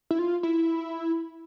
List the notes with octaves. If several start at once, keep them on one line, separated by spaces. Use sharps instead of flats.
E4
F4
E4